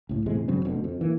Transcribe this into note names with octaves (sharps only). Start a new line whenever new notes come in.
C#2 A2
E1 A2 C3 G#3
G2 C#3 F#3 C4
F1 D2 B2
F2
E3 A#3